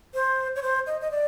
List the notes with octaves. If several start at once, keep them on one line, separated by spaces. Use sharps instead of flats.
C5
C#5
C5
D#5
D#5
D5